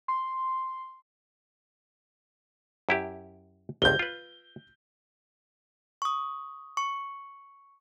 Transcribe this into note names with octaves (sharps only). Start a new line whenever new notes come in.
C6
F#2 E4 G4
G1 C#2 G6 G7
F4 B4
C#6 D#6
C#6 C#7